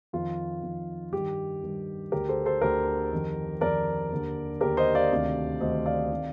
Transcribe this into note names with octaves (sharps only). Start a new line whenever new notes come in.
F2 D#3 F4
F2 D#3
G2 D#3 G4
G2 D#3
D2 D3 G4 A#4
A4 C5
A4 C5
D2 D3 G4 A#4
F2 D#3
F2 D#3 A#4 D5
D#2 D3
D#2 D3 G4 A#4
C5 D#5
D5 F5
D2 C3 D#3
D2 C3 D#3 C5 D#5
D5 F5
C3 D#3